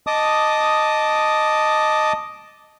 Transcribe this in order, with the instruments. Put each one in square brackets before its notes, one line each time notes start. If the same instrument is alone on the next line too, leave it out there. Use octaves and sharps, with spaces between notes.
[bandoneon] D#5 A5 D6 D#6